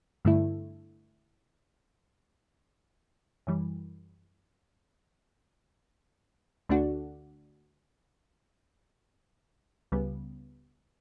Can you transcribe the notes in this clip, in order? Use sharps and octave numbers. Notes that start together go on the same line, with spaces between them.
G2 D3 A3 E4
F#2 E3 G3
D2 D3 A3 D4 F#4
C#2 C#3 G3 B3